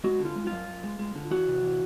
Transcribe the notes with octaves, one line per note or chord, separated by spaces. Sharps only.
G#3 F#4
D3
F4
G#3
F#2 F4
F#2
G#3
G#3
D3
E3 F#4
C3
E3